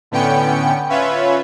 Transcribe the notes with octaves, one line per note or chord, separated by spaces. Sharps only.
A2 D3 B3 C#4 G5 C#7
C#4 F4 B4 C#5 E5